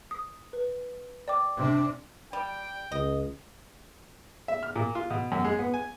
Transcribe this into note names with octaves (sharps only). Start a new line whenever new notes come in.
D#6
B4
D5 G5 D6
C3 D4
G3 G5
C#2 D#5
E5
F6
A#2
F4
B2
F#2
G#3
B3
G#5